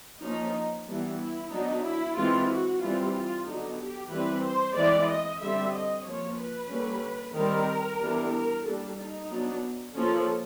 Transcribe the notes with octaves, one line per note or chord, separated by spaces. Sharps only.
F3 A#3 C#4 D#4
E3 G3 B3 D4
E4
F#3 B3 D4 D#4
E4
E3 G#3 C4 F4
F#4
E3 G3 C4 F4
F4
D3 F#3 B3 D4 D#4
G4
E3 G3 C4 B4
C5
E3 G#3 C4 D5
D#5
D3 G3 C4 E5
D#5
F3 A#3 C#4 C#5
B4
D3 G3 A#3 C#4
D#3 G3 C4 A#4
E3 G3 B3 D4
A#4
G3 A#3 D4 A4
D#4
F#3 B3 D4
F3 A#3 C#4 A4